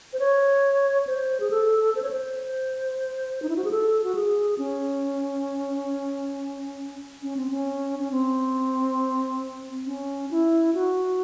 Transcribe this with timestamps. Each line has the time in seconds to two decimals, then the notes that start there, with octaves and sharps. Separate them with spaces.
0.13 C5
0.19 C#5
1.07 C5
1.40 G#4
1.51 A4
1.95 C5
2.02 C#5
2.11 C5
3.42 D#4
3.49 E4
3.56 F#4
3.64 G#4
3.71 A4
4.04 F#4
4.15 G#4
4.58 C#4
7.23 C#4
7.37 C4
7.50 C#4
7.99 C#4
8.11 C4
9.86 C#4
10.31 E4
10.74 F#4